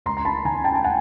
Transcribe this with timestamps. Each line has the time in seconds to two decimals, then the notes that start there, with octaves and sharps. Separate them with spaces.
0.06 C#2 A#5 C6
0.17 A#5
0.25 A5 B5
0.45 D#3 G#5 A#5
0.64 G5 A5
0.75 A5
0.84 F#5 G#5